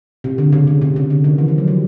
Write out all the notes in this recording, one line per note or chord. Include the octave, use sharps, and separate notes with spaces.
C3
D3
C#3
C#3
C3
C#3
D3
D#3
E3
F3
F#3
G3